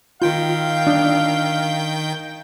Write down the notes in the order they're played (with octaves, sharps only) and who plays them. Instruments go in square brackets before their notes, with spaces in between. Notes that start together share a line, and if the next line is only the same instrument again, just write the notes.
[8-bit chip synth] D#3 G5 G6 [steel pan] F4 [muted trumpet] F5
[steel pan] D4